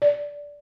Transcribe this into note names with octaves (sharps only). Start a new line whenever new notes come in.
D5